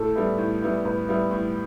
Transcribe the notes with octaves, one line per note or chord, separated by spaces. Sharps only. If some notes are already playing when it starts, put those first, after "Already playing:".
Already playing: A2 A4
G3 B3 E4
A2
G3 B3 E4
A2 B4
G3 B3 E4
A2